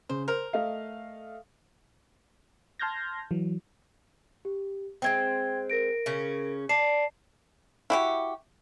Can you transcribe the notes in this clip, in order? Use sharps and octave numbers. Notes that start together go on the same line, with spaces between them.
C#3 C5
A#4 C5
A3 D#5 F5
A5 C6 F6 G6 G#6 A#6
E3 F#3
G4
G#3 A#3 C4 G5 G#6
A#4 A#6 D7
C#3 C#4
D5 A5 C7 E7
E4 F#4 G4